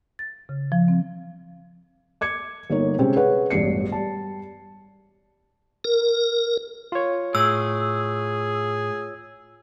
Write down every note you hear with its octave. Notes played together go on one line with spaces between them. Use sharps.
A6
C#3
F3
C4
D6 G#6 C#7
G1 A#3 D#4 C#5
C3 G#3 C4 C#4
G#4 B4 C#5 F#5
E1 A1 G2 C7 C#7
G3 A5
A#4
F4 C#5
A2 G#4 E6